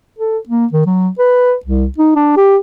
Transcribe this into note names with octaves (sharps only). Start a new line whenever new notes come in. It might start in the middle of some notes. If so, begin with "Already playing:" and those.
A4
A#3
D#3
F#3
B4
C2
D#4
D4
G4